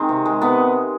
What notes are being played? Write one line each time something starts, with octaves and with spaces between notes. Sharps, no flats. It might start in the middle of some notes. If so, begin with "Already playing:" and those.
Already playing: D#3 G#3 C4
C3
G#3
C3 B3